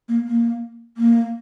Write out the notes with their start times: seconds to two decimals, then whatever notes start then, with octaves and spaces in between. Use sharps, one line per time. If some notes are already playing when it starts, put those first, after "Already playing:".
0.09 A#3
0.27 A#3
0.97 A#3